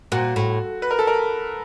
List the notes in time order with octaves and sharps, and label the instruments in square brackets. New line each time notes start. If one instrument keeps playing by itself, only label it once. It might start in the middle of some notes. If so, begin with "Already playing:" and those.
[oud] A#2 [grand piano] F#4
[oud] A2
[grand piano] B4
A#4
A4
A#4